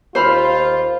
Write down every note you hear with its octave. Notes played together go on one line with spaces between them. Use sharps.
D#2 F4 C5 B5 F6